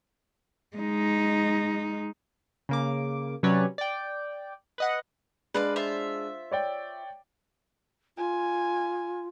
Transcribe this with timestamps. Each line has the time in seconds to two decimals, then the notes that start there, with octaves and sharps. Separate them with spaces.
0.77 G#3 D#4
2.69 C#3 A#3 D6
3.43 C3 F#3 C#4 B4 C#5 D5
3.78 D5 G5
4.78 B4 D#5 F#5
5.54 G#3 D4 B4 D5 F5
5.76 F4 C5 E5
6.51 C#5 D5 G5
8.18 F4 G#5